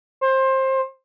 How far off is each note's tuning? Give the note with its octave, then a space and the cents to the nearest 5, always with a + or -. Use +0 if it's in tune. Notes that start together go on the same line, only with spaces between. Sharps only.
C5 +20